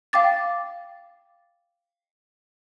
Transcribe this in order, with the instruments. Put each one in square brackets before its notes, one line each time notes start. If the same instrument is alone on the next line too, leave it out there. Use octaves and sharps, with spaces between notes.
[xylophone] F5 G5 D6 A6